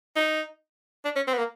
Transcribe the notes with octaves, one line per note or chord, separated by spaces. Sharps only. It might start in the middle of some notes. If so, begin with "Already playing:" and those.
D#4
D4
C#4
C4
B3
A#3